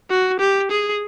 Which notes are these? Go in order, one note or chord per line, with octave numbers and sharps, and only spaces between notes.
F#4
G4
G#4